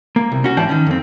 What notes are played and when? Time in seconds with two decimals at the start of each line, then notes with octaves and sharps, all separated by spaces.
0.16 A#3
0.32 C2
0.44 C#4 F#4
0.57 G#2 E3 C5 D5 G5 A5
0.69 D#3 C#4
0.86 F2 C4